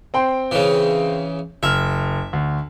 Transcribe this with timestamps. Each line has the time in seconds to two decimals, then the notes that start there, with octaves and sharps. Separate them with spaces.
0.14 C4 G5 C6
0.51 C#3 E3
1.63 F#1 E5 F6
2.33 D2